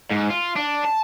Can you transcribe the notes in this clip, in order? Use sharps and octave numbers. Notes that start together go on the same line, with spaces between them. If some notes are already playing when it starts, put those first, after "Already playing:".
G#2
F4
D4
A5